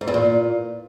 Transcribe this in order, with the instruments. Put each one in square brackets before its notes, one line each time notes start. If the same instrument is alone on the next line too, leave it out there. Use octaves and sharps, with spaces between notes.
[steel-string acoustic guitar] G#2
E2
A#2